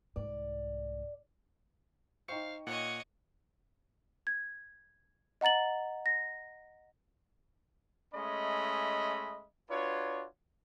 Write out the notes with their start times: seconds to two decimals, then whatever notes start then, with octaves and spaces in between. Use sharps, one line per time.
0.16 C2 G#2 D5
2.28 D#4 C5 F5 G5 C#6 C#7
2.67 A#2 C#5 D#5 F#5
4.27 G#6
5.41 D#5 F#5 A#5 A6 F#7
6.06 A#6
8.14 G#3 A3 C#4 D#5 E5 B5
9.70 D4 F4 F#4 B4 C#5